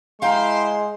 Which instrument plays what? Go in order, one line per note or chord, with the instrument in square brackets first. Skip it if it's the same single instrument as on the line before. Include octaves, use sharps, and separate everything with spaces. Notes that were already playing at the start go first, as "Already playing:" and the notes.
[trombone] G#3 [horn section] E4 C5 C6 [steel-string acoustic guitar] F5 G5 A#5